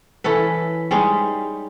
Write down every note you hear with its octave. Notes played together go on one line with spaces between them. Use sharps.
E3 C#4 A4 B4
G3 G#3 C#4 D#4